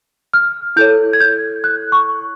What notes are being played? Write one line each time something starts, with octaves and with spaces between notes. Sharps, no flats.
F6
E4 A4 C#5 G6
G#6
G6
F#6
C#6